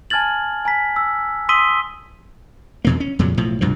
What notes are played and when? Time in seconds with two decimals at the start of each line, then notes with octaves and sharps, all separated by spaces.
0.10 G#5 A5 F6 G#6 A6 F#7
0.65 G#5 A#5 B6
0.96 E6
1.49 C6 D#6 E6 B6 D#7 G7
2.85 E2 B2 A#3
3.00 C#4
3.19 F2 A#2 C#3 F#3
3.37 B1 A2 F3
3.61 C2 G2 B2 F3